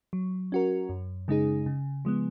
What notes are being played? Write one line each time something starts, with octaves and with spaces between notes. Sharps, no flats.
F#3
C#4 F#4 A#4
F#2
C#3 G#3 D#4 G#4
C#3
F3 G#3 B3